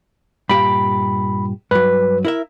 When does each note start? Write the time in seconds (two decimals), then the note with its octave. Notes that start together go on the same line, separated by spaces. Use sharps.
0.49 G2 A#2 G4 B5
1.71 G2 F#3 B4
2.25 E4 A#4 E5